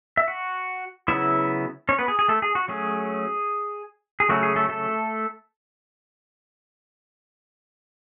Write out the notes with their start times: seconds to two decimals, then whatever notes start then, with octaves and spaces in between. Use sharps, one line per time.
0.17 E5
0.28 F#4 F#5
1.08 C#3 F#3 B3 E4 E5
1.89 C#4 C#5
1.99 B3 B4
2.08 G#4
2.19 G#4
2.28 A3 A4
2.42 G#4
2.55 F#4
2.68 F#3 A3 C#4 G#4
4.20 G#4
4.29 C#3 F#3 A3 C#4 F#4
4.43 G#4
4.56 A3 A4
4.69 A3 A4